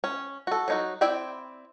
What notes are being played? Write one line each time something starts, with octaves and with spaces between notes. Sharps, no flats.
C#4
F#4 A4
F#3 D#4 F#4
C4 E4 D5 E5 G5